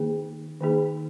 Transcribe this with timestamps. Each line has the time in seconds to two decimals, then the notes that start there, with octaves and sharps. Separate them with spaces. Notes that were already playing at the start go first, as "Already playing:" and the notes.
Already playing: D#3 A#3 D#4 G#4
0.61 D#3 A#3 D#4 G#4